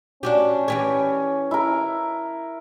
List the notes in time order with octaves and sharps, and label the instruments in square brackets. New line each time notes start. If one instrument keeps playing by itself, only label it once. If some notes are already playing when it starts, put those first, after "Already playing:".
[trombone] C#4 [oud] D4 F#4 G4
[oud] E3 G4 C#5
[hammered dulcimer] E4 A#4